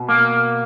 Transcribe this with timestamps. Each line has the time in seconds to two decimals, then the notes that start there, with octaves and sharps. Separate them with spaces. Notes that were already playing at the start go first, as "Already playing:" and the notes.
Already playing: B2
0.09 A#3